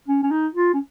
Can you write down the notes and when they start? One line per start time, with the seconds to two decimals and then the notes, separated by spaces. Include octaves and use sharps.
0.08 C#4
0.23 C#4
0.31 D#4
0.55 F4
0.73 C#4